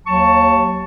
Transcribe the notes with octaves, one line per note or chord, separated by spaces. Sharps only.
D#2 F#3 A5 C#6